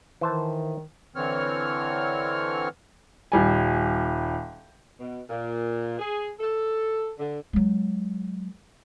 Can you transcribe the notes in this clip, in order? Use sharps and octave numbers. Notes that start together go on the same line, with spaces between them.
D#3 E3 C5 A5
D3 E3 C4 C#5 F6
D#1 G3 G#5
B2
A#2
G#4
A4
D3
F#3 G#3